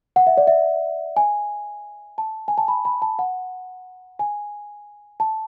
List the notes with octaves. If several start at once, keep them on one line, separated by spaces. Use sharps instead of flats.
F#5
E5
D5
E5
G#5
A5
G#5
A5
B5
B5
A5
F#5
G#5
A5